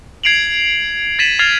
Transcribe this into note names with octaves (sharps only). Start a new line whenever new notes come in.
G#6 C7 D7 F7 F#7
G#6 A6 B6 D#7 E7 F#7
F6 G#6 A6 C7 E7 F7